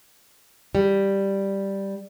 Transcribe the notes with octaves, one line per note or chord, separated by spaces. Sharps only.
G3